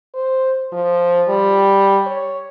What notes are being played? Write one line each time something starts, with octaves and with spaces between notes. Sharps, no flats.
C5
F3
G3
C#5